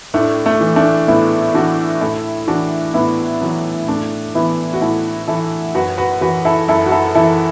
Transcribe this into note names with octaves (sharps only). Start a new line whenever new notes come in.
A2 A3 D4
A3
E3
A3 D4
A2 B3 E4
E3 D4 F#4
A2 E4 A4
E3 D4 F#4
A2 B3 E4
E3 F#3 B3
A2 A3 D4
E3 B3 E4
F#4
A2 E4 A4
E3 E4 A4
F#2 F#4 B4
F#4 B4
E3 F#4 B4
E4 A4
F#2 E4 A4
F#4
E4 A4
E3 E4 A4